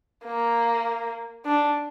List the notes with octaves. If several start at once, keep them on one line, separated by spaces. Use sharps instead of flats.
A#3
D4